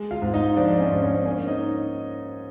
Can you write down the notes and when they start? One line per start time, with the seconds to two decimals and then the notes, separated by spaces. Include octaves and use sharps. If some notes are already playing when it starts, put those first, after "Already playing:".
Already playing: G#3
0.11 F4 F5
0.22 G#2
0.34 D#4 D#5
0.56 F3 D4 D5
0.80 C#4 C#5
0.91 G#2
1.02 C#4 C#5
1.25 A#3 C#4 C#5
1.48 D#4 D#5